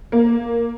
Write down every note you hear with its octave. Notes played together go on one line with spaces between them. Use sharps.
A#3